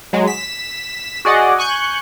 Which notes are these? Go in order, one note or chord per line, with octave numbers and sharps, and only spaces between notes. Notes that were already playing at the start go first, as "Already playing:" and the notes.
F#3 G#3
B6 E7
F#4 G#4 D5 D#5 F#5
G#5 C#6 F#6 G6